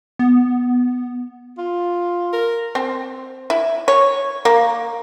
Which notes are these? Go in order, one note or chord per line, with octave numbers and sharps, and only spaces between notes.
B3
F4
A#4
C4
E4
C#5
A#3